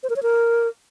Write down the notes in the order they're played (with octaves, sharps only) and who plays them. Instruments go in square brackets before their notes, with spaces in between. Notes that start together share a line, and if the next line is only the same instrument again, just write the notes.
[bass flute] C5
A#4
C#5
A#4